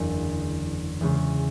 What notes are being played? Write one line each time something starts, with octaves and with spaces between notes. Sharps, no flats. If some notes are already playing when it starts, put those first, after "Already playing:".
Already playing: F#1 E2 D3
E2 C#3 G#3 C#4